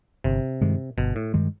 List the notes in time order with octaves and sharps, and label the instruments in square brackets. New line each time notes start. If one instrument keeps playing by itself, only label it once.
[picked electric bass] G1 [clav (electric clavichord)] C3
[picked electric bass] G2 D#3 G#3
[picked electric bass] G1 [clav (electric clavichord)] B2
[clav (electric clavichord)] A2
[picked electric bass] G2 D#3 G#3